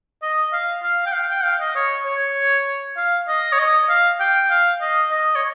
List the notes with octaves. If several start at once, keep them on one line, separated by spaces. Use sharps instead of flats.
D#5
F5
F5
G5
F5
G5
F5
D#5
C#5
C#5
F5
D#5
C#5
D#5
F5
G5
F5
D#5
D#5
C#5